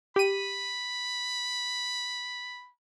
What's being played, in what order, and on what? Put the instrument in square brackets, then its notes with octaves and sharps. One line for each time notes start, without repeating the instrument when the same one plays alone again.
[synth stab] G4 D#7 [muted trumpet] B5